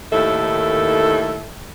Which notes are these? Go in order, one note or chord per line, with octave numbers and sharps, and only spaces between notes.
D#2 A2 D#3 A4 E5